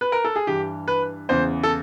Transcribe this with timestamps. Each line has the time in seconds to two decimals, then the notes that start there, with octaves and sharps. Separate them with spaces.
0.01 B4
0.12 A#4
0.24 A4
0.36 G#4
0.47 G2 E3 G4
0.88 B4
1.29 E2 C#3 E3 C5
1.63 A4